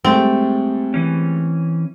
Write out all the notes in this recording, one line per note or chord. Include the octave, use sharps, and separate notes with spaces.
G#2 G3 A3 C4
E3 C#4